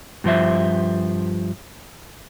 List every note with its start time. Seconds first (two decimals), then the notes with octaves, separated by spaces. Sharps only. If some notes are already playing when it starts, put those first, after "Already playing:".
0.24 G2 F3 C5 E5